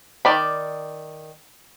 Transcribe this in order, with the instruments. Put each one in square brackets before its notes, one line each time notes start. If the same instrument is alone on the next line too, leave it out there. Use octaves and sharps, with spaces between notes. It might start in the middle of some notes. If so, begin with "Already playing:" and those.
[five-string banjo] D#3 D5 B5